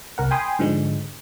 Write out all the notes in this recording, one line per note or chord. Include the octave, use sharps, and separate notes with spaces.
C2 A#4 F#5
G5 G#5 B5 C6 D#6
G#2 D3 F3 G#3